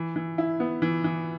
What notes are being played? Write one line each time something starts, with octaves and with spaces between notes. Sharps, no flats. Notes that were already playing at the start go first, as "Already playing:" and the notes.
Already playing: E3
E3
E4
B3
E3
E3